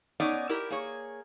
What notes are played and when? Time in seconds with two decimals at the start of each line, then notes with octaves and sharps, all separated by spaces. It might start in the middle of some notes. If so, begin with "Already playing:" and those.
0.20 B3 C#4 D#4 D5
0.49 E4 G4 A#4
0.70 A#3 G#4 C#5